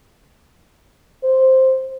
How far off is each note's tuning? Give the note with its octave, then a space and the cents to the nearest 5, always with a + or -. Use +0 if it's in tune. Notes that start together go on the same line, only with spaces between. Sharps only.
C5 +5